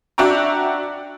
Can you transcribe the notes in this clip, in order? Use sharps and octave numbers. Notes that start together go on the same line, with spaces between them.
D4 F#4 E5 G5 A#5